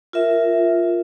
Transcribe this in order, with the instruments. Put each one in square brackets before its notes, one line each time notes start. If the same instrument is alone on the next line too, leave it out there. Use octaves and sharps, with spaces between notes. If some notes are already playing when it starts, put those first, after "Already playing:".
[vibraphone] F4 A#4 E5